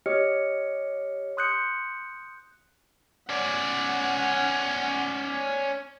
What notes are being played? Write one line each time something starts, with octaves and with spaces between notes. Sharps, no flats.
G4 C#5 D#5 F6 C#7
C6 D#6 F#6 G6 C#7
C#4 D5 F#5